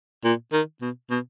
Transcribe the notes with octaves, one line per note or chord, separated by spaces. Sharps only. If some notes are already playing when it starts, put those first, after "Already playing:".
A#2
D#3
B2
B2